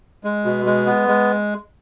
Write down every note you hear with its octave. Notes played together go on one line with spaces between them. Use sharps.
G#3
B2
G#3
B3
G#3